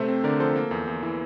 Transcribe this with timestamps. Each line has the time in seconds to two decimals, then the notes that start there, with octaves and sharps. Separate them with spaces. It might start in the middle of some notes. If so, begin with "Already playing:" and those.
Already playing: C3 A3 C5 E5
0.08 C4
0.24 D3 A#4 D5
0.40 F3 A4 C5
0.56 A#3
0.71 E2
0.87 E2
1.03 E3